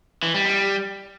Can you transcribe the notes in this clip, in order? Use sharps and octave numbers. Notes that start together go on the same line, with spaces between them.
E3
G3
G3